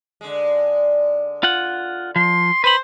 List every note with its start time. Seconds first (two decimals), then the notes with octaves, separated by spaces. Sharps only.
0.21 D3 G#3
1.43 F4 F#5
2.16 F3 C6
2.64 B4 C5 B5